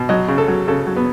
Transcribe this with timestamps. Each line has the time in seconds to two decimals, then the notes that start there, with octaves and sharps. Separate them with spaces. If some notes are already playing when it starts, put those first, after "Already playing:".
Already playing: B2
0.09 F#3 D#5
0.28 C#3
0.38 A4
0.48 F#3
0.67 C#3 A4
0.87 F#3
0.96 B3